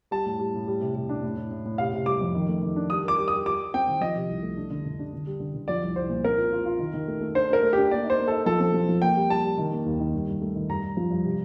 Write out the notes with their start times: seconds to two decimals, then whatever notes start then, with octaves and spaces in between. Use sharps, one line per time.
0.11 G3 A5
0.26 A2
0.39 G3
0.54 A2
0.67 G3
0.81 C3
0.95 C3
1.09 D4
1.23 A2
1.36 A2
1.51 A2
1.65 A2
1.78 C3 F5
1.93 C3
2.06 G3 D6
2.21 F2
2.35 D#3
2.48 A3
2.63 D#3
2.76 D4
2.90 G3 D#6
3.04 A#4 D6
3.18 G3
3.28 G4 D#6
3.46 G3 D6
3.60 G3
3.74 C4 G5
3.87 D#3
4.01 F3 D#5
4.15 C3
4.29 C2
4.43 A3
4.57 D4
4.70 D3
4.85 D3
4.99 D4
5.13 D3
5.27 G3
5.40 D3
5.54 D3
5.68 F3 D5
5.83 C2
5.96 C2 C5
6.10 A#2
6.24 C4 A#4
6.37 F4
6.52 F4
6.65 F4
6.79 D#3
6.93 D#3
7.07 A3
7.21 A3
7.35 D4 C5
7.50 D4 A#4
7.63 A3
7.73 D4 G4
7.91 A#3 D5
8.04 D#4
8.10 C5
8.19 A#3
8.28 D#4 A4
8.46 F3 A4
8.60 C4
8.74 F3
8.89 F3
9.02 A#3 G5
9.16 G3
9.30 G3 A5
9.44 G3
9.58 D#3
9.72 A#3
9.86 D#2
9.99 D#3
10.14 G2
10.27 G2
10.41 A3
10.55 D#3
10.69 G2 A#5
10.83 G2
10.97 F3
11.10 G2
11.24 C3